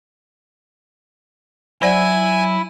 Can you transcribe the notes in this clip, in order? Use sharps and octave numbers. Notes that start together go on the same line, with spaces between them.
F#3 E4 C5 D5 F#5 G#5